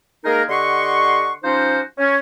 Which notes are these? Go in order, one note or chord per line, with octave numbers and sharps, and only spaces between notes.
G#3 A#3 D#4 G#4 A#4
D3 G4 D#5 F#5 C6 C#6
F3 C#4 D#4 F#4 C5
C#4